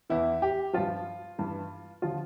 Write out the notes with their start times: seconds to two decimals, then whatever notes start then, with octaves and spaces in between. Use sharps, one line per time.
0.10 E2 E3 E4
0.42 G4
0.73 G2 F3 F4
1.38 G2 E3
2.02 D3 F3 F4